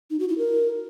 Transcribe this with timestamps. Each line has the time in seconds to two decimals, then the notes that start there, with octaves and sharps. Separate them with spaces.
0.10 D#4
0.19 F#4
0.29 E4
0.38 A#4